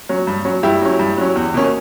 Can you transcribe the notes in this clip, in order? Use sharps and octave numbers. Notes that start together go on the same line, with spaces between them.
F#3 C#4
G2
F#3 C#4
G2 E4 G4
F#3 C#4
G2
F#3 C#4
E2
B2 A#3 C#4